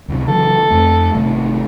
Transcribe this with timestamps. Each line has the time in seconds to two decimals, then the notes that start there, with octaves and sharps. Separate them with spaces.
0.08 C#2 C3
0.28 C#3 E3 F#3 A4
0.70 F2 A3
1.15 G#1 C3 A3